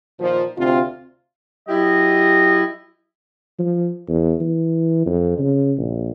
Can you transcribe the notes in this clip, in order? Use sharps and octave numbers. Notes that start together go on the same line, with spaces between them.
A#2 D#3 F3
D2 C3 C4 F4
F#3 E4 G4 D#5
F3
E2
E3
F2
C#3
A#1